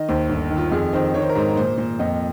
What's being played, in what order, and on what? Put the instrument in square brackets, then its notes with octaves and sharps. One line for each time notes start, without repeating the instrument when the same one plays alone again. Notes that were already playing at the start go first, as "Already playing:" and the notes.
Already playing: [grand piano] D#3 D#5
D#2 C5
G1
D#3
F4
F2 G#4
D#3 C5
D#3 C#5
C5
A#4
G#2 C5
A#2 C5
A#2
F2 D#5